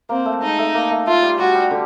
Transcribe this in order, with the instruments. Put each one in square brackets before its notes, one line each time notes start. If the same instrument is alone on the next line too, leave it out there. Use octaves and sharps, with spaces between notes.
[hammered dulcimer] A#3 [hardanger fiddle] C4
[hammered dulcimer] A3
[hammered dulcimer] G#3 [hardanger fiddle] D#4
[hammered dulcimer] A3
A#3
A3
[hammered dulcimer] A3 [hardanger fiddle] F4
[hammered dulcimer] G3
[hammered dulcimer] G3 [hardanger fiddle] F#4
[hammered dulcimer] G3
D3